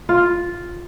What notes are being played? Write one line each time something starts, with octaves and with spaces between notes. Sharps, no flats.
F4